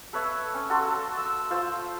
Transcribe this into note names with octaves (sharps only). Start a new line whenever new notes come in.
A4 B4 C#5 E5
C#4
F#4 A4 C6
A4
E6
F4 C5 E6